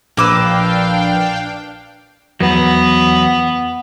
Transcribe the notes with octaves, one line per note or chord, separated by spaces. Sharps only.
A#1 A#3 D4 B4 F5 G5 D6 E6
E2 F#3 B3